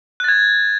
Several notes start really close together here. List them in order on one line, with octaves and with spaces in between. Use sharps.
F#6 A6 G#6